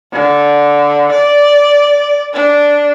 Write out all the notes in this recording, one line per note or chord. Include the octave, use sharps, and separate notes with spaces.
D3
D5
D4